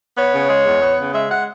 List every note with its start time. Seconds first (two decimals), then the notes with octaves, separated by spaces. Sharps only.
0.17 B3 C#5
0.33 C#3
0.49 G#3
0.66 E2
0.82 B3
0.99 C#3
1.14 G#3 E5
1.30 F#5